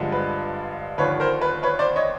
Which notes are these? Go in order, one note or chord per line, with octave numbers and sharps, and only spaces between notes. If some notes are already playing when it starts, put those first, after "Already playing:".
Already playing: G2 D3 F3 G#3
B4
D#2 D3 F3 B4 C#5
A#4 C5
B4
B4 C#5
C5 D5
C#5 D#5